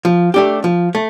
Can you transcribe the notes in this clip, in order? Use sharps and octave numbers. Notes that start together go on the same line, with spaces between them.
F3
A3 D4 G4
F3
A3